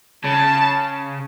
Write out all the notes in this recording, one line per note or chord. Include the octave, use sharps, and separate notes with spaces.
C#3 A5